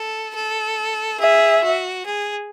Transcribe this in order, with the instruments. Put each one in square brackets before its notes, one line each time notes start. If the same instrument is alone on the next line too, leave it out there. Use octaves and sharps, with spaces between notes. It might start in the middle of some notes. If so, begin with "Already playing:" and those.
Already playing: [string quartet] A4
A4
[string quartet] G#4 [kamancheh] E5
[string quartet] F#4
G#4